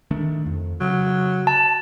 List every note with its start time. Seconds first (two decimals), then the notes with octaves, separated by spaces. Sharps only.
0.11 D#3 A3 D4
0.46 F2
0.81 C#3 F#3
1.47 A5